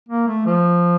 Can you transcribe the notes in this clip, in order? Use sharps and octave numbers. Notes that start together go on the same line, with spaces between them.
A#3
A3
F3